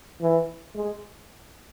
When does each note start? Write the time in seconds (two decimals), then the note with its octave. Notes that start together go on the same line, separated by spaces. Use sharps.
0.21 E3
0.75 G#3